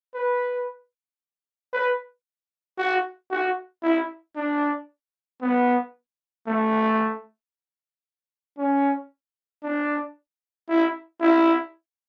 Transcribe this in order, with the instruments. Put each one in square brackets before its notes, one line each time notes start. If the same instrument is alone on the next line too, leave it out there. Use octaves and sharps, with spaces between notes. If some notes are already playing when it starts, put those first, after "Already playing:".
[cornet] B4
B4
F#4
F#4
E4
D4
B3
A3
C#4
D4
E4
E4